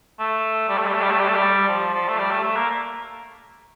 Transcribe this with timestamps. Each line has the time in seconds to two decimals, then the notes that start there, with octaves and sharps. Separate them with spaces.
0.19 A3
0.69 G3
0.78 A3
0.86 G3
0.94 A3
1.02 G3
1.11 A3
1.20 G3
1.28 A3
1.35 G3
1.69 F3
1.94 F3
2.09 A3
2.18 G3
2.31 A3
2.44 A3
2.56 A#3